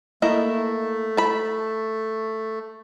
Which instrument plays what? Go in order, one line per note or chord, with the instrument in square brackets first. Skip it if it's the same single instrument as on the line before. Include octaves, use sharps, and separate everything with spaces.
[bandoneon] A3 [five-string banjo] A#3 E4 D#5
[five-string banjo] A5 B5